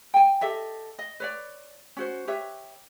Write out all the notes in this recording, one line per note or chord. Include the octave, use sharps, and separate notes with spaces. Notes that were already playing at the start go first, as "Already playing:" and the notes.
G5 G#5
G4 A4 D#5 E5
D#5
B4 C#5 D5
C#4 F#4 C5
G4 B4 C#5 E5